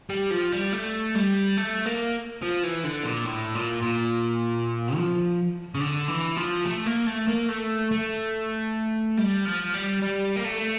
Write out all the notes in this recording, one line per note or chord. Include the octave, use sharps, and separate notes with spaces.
G3
F3
G3
A3
G3
A3
A#3
F3
E3
D3
A#2
A2
A#2
A#2
F3
C#3
D3
E3
F3
A3
A#3
A3
A#3
A3
A3
G3
F3
G3
G3
A#3
A3